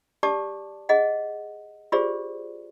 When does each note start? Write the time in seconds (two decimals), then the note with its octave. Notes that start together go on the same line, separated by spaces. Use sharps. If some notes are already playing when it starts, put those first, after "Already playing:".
0.23 G4 D5 A5 D6
0.89 G#4 D#5 F#5
1.92 F4 G4 G#4 C5 D5